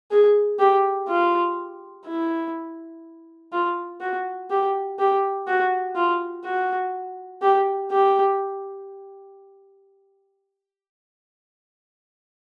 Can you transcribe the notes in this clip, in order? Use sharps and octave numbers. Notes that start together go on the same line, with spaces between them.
G#4
G4
F4
E4
F4
F#4
G4
G4
F#4
F4
F#4
G4
G4